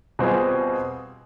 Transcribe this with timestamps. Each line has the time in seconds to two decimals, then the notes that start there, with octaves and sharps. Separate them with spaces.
0.19 B2 G3 C4 F4 G#4